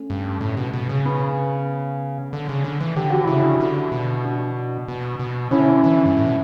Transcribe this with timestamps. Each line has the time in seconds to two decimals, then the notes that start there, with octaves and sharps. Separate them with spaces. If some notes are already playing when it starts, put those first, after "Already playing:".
Already playing: A3 C#4
0.10 G2
0.41 A2
0.57 B2
0.74 B2
0.89 C#3
1.05 B3
2.33 D3
2.49 C#3
2.64 D3
2.81 E3
2.96 D3 G4
3.10 F#4
3.24 C#3 E4
3.38 D4 F#4
3.60 D3
3.92 B2
4.24 D4 F#4
4.88 B2
5.20 B2
5.51 D3 C#4 E4
5.84 E3
6.06 G2
6.16 A2
6.26 B2